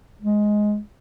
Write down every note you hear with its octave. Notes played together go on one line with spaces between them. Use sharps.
G#3